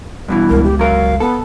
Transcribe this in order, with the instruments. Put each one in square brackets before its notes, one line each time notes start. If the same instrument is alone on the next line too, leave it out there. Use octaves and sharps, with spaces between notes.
[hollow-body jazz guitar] G2 B2 E3
[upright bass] G1 C#2 [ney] A#4
[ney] G4
[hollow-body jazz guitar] F#3 A#4 [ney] F5
[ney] B3 [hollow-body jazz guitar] A4